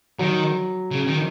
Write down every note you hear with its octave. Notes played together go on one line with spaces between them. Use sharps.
D#3 F#3
C#3
D#3